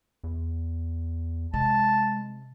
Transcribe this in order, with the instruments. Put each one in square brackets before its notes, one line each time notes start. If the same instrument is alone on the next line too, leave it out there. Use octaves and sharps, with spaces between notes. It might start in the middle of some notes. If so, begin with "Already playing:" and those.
[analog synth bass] E2
[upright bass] C3 [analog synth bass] G#3 [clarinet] A5